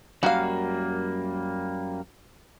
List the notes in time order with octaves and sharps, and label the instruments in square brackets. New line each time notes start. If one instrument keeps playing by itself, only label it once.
[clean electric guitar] F#2 G3 A#3 [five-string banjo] F#4 F5